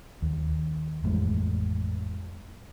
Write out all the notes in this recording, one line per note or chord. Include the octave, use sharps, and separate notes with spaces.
D#2
A1 F2 A2 G#3